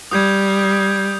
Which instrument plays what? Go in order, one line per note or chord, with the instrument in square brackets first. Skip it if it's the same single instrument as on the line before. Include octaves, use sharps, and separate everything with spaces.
[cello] G3 [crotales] D#6 G6 G#6